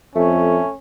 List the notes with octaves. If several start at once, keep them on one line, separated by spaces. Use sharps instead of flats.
F2 A3 C#4